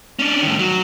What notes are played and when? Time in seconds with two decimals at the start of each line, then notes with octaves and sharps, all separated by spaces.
0.19 C#4 D4
0.42 A2 D#3
0.59 F#3